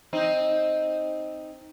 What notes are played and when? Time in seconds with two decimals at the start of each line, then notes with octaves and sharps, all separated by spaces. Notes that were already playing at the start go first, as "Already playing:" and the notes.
0.13 C4 D#4